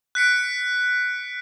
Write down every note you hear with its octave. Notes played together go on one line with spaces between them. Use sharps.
F#6 B6 C#7 D7